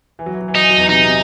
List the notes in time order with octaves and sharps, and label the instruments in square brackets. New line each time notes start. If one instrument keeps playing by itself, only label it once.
[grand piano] E3
F#3
E3
F#3
E3
[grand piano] F#3 [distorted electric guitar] D#4
[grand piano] E3
F#3
E2 E3
[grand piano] C3 [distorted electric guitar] D#4
[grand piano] C3